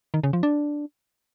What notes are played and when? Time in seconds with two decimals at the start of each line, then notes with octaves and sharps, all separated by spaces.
0.14 D#3
0.24 C#3
0.33 F3
0.43 D4